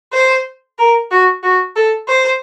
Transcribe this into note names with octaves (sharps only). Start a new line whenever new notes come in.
C5
A#4
F#4
F#4
A4
C5